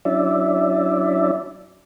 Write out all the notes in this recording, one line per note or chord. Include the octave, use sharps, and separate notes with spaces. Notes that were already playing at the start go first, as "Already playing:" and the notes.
F#3 C#4 D4 E4 D5 E5